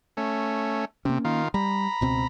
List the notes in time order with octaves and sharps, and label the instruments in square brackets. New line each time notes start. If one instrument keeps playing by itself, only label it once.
[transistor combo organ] A3 C#4
[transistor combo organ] C3 [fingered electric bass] A#3 C#4
[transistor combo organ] D#3 F4
[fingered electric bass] G3 [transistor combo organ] A#5 B5
[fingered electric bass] C#2 B2 C4